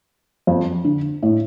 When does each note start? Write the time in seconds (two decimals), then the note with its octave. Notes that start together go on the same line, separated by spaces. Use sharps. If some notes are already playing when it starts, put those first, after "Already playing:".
0.47 F2
0.84 D3
1.23 A2